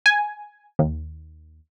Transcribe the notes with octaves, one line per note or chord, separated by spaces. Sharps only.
G#5
D#2